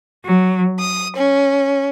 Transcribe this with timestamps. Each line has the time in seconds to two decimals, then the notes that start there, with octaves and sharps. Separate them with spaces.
0.25 F#3
0.79 D#6
1.16 C#4